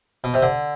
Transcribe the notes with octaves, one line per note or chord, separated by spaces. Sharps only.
B2
C3
D3